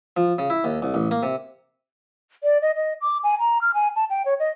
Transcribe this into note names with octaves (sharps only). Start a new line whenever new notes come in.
F3
C#3
E4
D#2
C2
A1
A#3
C3
D5
D#5
D#5
D6
G#5
A#5
F6
G#5
A5
G5
C#5
D#5